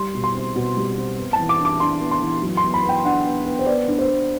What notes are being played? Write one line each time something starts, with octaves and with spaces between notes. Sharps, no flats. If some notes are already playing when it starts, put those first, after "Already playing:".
Already playing: G3 C6
B2
C6
C4
B2
G3
C4
B3
A5
E3
D6
D4
D6
D4 C6
B3
C6
E3
F#3
C6
B3
B5
B3
G5
D4 F#5
B3
B3
C5
B3 D5
D4
C5
B3